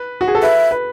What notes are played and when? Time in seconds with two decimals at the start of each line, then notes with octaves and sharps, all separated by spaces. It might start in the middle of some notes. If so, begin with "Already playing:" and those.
Already playing: B4
0.21 F#4
0.28 G#4
0.35 A4
0.42 B4 E5
0.71 B4